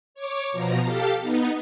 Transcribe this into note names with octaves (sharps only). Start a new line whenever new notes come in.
C#5 D6
B2 F3 A#5
G4 A4 F5 F6 A6
B3 D#4